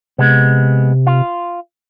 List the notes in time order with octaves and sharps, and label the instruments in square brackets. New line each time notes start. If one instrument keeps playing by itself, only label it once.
[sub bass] C3 [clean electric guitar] G#3 B3
[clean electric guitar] F4